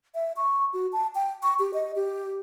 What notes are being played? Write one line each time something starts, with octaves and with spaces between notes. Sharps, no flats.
E5
C#6
F#4
A5
G5
C#6
G4
D#5
G4